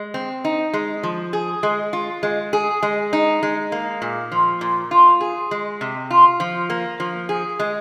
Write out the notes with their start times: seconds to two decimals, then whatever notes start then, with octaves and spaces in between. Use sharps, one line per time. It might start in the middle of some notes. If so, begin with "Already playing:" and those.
Already playing: G#3
0.14 C4
0.45 D#4
0.73 G#3
1.03 F3
1.33 G#4
1.63 G#3
1.93 F4
2.23 G#3
2.53 G#4
2.83 G#3
3.13 D#4
3.43 G#3
3.72 A#3
4.02 A#2
4.32 F3
4.61 A#2
4.91 F4
5.21 G#4
5.51 G#3
5.81 C3
6.11 F4
6.40 F3
6.70 A#3
7.00 F3
7.29 G#4
7.60 G#3